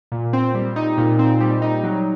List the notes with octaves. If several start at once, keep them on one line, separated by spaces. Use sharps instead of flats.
A#2
C4
G3
D#4
A#2
C4
G3
D#4
F#3